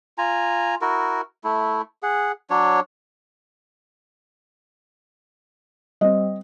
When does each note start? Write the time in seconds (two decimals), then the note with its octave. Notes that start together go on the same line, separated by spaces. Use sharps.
0.18 F4 G#5 A#5
0.82 E4 F#4 A#4
1.44 A3 E4
2.03 G#4 F#5
2.50 F#3 D4 C#5
6.01 G3 C4 D#5